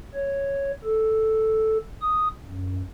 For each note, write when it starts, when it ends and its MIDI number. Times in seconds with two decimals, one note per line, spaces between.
0.15 0.72 73
0.85 1.78 69
2.02 2.28 87
2.45 2.81 42